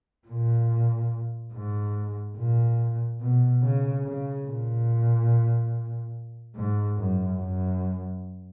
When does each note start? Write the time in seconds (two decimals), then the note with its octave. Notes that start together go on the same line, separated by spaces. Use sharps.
0.28 A#2
1.53 G#2
2.37 A#2
3.21 B2
3.62 C#3
4.04 C#3
4.46 A#2
6.55 G#2
6.97 F#2
7.38 F#2